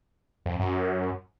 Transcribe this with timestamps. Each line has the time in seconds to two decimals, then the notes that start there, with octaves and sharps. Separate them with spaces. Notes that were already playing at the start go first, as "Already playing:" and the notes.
0.46 F2
0.59 F#2